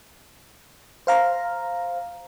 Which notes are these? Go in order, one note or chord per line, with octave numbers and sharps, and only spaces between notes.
C5 F5 A#5